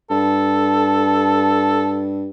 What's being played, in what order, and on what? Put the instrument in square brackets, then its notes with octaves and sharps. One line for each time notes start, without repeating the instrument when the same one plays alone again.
[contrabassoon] G2 [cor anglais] A4